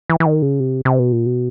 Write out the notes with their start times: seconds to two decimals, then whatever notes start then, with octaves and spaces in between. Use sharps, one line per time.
0.10 E3
0.20 E3
0.26 D#3
0.42 C#3
0.60 C3
0.85 C3
0.99 B2
1.12 A#2
1.26 B2